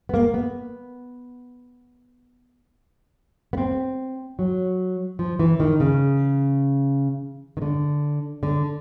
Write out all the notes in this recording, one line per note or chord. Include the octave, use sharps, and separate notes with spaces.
B3
A#3
B3
B3
C4
F#3
F3
E3
D#3
C#3
D#3
D3
D3